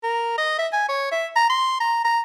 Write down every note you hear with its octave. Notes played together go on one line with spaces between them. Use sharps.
A#4
D#5
E5
G#5
C#5
E5
A#5
C6
A#5
A#5